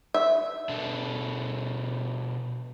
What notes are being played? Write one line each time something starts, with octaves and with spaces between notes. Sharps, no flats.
E5
B2 D4 A4